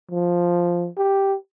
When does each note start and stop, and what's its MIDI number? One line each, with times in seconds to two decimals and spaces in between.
0.11 0.88 53
0.97 1.35 67